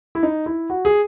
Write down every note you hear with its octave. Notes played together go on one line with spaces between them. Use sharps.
E4
D#4
E4
F#4
G#4